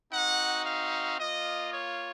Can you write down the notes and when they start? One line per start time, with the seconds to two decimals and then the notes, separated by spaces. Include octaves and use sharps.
0.12 C4 D#4 F#4 F#5
0.66 F5
1.20 A#3 F4 D#5
1.73 C#5